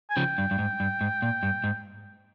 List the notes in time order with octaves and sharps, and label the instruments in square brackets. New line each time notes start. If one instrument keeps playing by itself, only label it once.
[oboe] G#5
[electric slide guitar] C#3 F3 [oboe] G5
[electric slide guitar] G2
G2
G#2
G2
G#2
A#2
G2
G#2